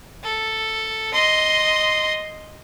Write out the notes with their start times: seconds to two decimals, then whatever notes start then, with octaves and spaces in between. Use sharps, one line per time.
0.23 A4
1.13 D#5 C6